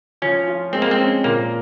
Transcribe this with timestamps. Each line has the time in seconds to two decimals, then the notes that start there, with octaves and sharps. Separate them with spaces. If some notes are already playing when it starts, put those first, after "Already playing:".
0.22 F3 C#4
0.47 F4
0.73 G#3 C4
0.82 A#3
0.91 C4
0.98 C#4
1.24 A#2 A#3